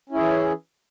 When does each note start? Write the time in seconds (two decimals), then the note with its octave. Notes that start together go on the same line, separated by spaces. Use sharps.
0.09 C#4
0.12 E4
0.15 G#4
0.17 E3